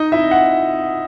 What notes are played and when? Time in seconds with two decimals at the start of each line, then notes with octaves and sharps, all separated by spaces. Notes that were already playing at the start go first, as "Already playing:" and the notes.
Already playing: D#4 D#5
0.12 E4 E5
0.31 F#5